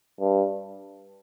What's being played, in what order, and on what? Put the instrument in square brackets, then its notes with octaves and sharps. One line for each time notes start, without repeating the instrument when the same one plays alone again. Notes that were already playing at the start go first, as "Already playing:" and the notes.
[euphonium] G2